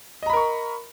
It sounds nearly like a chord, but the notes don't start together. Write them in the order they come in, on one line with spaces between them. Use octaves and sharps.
D#5 A#5 B5 A#4 C#6